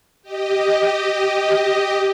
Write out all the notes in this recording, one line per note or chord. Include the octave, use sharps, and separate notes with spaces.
G4 D#5